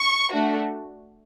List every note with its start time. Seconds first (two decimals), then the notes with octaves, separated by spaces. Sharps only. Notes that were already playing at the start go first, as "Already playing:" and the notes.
Already playing: C#6
0.32 A3 D4 F#4